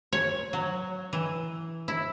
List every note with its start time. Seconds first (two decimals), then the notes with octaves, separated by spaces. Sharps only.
0.13 C#5
0.53 F#3
1.13 E3
1.88 E4